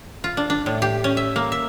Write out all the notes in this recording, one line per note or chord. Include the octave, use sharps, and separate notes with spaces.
F4
D4
D4
A2
G4
C#4
E5
A#3
E5